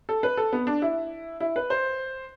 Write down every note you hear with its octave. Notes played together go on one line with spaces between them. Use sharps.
A4
B4
A4
B3
D4
E4
E4
B4
C5